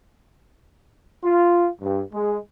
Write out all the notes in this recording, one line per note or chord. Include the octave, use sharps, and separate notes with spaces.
F4
G2
G#3